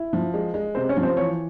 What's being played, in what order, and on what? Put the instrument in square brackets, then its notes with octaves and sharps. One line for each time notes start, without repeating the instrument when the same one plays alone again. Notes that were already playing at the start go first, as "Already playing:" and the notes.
Already playing: [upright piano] E4
F3
G#3
G#3
[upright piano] C3 [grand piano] C4 C5
[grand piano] C#4 C#5
[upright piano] F3
[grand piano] C4 C5
[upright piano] E3 [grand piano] C#5